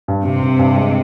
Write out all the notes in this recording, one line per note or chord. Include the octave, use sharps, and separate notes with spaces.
G2
G2 C3
G2
G2
G#3